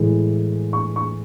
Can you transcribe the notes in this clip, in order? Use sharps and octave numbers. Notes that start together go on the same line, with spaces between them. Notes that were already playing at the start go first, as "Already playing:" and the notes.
Already playing: A2 E3 G#3
C#6
C#6